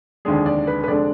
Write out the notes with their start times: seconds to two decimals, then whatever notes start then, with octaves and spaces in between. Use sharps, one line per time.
0.25 F1 D#2 D3 G#3 D4 G#4
0.46 D5
0.67 B4
0.83 B4
0.87 F1 D3 G#3 D4 D5